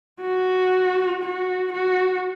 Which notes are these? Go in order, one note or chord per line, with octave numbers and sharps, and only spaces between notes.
F#4
F#4
F#4